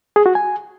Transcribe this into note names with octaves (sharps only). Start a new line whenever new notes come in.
G#4
F#4
G#5